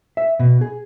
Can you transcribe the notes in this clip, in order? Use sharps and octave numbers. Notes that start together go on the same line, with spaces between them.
E5
B2
G#4